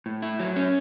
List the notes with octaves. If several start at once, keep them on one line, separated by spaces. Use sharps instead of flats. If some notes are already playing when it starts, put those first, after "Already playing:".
A2
E4
F#3
C#4